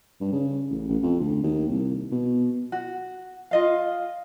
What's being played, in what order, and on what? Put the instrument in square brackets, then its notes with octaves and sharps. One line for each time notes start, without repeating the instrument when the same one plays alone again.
[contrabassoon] G2
C#3
A1
A1
F2
D2
D#2
C2
B2
[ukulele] F#4
F4 D#5 F5